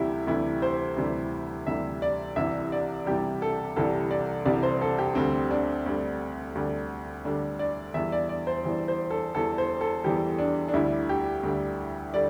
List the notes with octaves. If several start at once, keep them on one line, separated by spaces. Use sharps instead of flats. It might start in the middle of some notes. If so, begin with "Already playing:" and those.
Already playing: D2 C3 E3 G3 E4 G4
D2 C3 E3 G3 E4
C5
D2 C3 E3 G3
D2 C3 E3 G3 E5
D5
C2 C3 E3 G3 E5
D5
C2 C3 E3 G3 G4
A4
C2 C3 E3 G3 A4
D5
C2 C3 E3 G3 D5
C5
A4
G4
D2 D3 G3 C4
D4
D2 D3 G3
D2 D3 G3
D2 D3 G3 D4
D5
E2 E3 G3 E5
D5
D5
C5
E2 E3 G3
C5
A4
E2 E3 G3 A4
C5
A4
E2 E3 G3 G4
D4
D4
D2 D3 G3 E4
G4
D2 D3 G3
D3 G3 D5